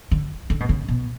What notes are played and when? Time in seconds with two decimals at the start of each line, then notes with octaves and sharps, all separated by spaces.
0.11 D3
0.50 D3
0.60 B2
0.69 C#3
0.88 B2